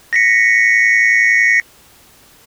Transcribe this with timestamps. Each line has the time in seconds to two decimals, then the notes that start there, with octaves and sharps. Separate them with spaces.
0.13 A#6 B6 C#7